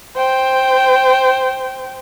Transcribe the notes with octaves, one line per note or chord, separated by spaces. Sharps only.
C5 G5